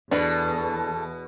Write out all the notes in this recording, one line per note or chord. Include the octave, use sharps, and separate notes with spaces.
E2 B2 D4 A4 B4